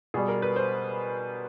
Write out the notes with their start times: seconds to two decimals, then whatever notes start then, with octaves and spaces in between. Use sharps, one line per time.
0.14 B2 G3 G#4
0.28 A#4
0.42 B4
0.56 C5